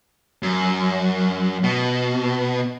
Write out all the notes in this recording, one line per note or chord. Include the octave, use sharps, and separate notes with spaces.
F#2
B2